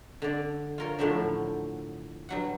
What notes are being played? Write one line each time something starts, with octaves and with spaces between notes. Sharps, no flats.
D3 D5
F4 A#4 C#5
A2 D3 F3 F#3 D4
G2 F#3 F#5